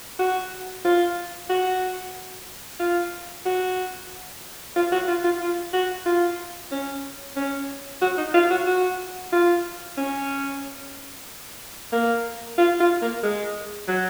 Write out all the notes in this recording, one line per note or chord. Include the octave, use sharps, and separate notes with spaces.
F#4
F4
F#4
F4
F#4
F4
F#4
F4
F4
F4
F#4
F4
C#4
C#4
F#4
D#4
F4
F#4
F#4
F4
C#4
A#3
F4
F4
A#3
G#3
F#3